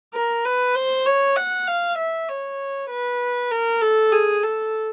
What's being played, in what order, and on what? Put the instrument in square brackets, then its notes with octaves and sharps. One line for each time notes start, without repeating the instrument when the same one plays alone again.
[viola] A#4
B4
C5
C#5
F#5
F5
E5
C#5
B4
A#4
A4
G#4
A4